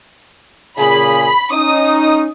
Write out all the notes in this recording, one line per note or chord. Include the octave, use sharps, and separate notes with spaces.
A#2 C#3 G#4 B5
C#4 D#4 D#6